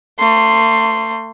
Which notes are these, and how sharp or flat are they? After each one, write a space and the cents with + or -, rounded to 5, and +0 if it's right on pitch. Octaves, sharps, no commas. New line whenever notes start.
A3 +35 C6 +0